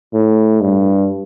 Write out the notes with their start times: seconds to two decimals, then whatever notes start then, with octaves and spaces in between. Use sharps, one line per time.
0.13 A2
0.62 G2